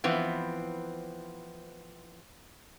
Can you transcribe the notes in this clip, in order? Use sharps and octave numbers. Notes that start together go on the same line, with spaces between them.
E3 F3 B3 C4